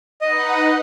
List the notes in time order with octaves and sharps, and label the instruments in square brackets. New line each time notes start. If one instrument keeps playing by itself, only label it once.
[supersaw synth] D#4 B4 F#5 [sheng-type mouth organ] D#5